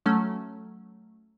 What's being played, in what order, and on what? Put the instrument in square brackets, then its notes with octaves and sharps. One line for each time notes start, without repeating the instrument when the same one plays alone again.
[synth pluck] F#3 A3 C#4